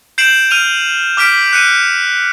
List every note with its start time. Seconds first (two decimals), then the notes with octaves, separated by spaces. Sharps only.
0.18 G6 C7 D7 E7 F#7
0.51 F6 D#7 F7
1.17 D6 F6 B6 D7
1.53 F#6 C#7 D#7